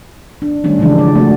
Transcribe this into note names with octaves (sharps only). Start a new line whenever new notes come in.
D4
D#3 G3 A3 C#4 D4
C#3 E3 F3 G#3 D4
D5
A3 C4 F#4